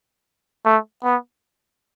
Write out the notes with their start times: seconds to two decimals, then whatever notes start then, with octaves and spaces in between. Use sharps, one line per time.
0.65 A3
1.04 B3